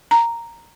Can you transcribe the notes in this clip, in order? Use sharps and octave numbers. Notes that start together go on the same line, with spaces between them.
A#5